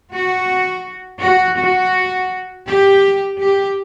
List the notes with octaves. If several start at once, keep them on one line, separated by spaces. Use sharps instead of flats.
F#4
F#4
F#4
G4
G4